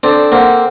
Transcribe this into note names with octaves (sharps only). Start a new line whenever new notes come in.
C4 D4 A4
A#3 C4 F#5